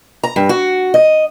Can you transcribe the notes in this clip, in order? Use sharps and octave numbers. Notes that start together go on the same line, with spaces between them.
A#5
G2
F#4
D#5